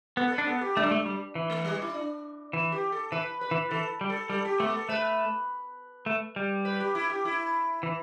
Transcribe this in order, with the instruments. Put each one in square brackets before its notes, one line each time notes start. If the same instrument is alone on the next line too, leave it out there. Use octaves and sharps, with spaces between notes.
[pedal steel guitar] B3 [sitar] A4
[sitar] A4
B4
[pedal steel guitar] D4
[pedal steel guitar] B3 [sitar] A4
[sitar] G4
[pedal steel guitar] A3 [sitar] D4
[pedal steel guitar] G3
A3
G3
E3
[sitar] A3
G3
E4
D4
[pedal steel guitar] E3
[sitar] G4
A4
[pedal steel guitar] E3 [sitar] B4
[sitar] B4
[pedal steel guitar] E3
[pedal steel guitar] E3 [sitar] A4
[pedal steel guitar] G3
[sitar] A4
[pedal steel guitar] G3 [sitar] A4
[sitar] G4
[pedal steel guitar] A3 [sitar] B3
[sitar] A4
[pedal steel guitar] A3 [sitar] B4
[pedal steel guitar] A3
G3
[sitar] B4
G4
E4
G4
E4
[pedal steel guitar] E3